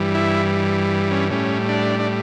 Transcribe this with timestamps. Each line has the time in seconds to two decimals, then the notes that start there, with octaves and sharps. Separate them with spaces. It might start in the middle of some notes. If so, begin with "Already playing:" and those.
Already playing: G2 E3 G3
0.15 E4
1.11 C#4
1.31 A2 G3 C#4
1.69 D4
2.00 D4